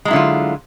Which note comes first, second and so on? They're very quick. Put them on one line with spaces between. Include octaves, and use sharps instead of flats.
G#3 F#3 E4 D3 F4